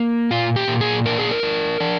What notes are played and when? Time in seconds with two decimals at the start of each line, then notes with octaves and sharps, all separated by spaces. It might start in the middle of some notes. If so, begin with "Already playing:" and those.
Already playing: A#3
0.31 A#2 F4
0.56 G4
0.68 A#2
0.81 G#4
1.06 D4 A#4
1.18 G#4
1.31 A#4
1.43 D4
1.80 D4